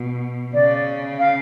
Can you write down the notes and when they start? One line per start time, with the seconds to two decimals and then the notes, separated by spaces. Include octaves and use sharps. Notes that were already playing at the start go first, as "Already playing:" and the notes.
Already playing: B2
0.54 C#3 D5
1.19 F5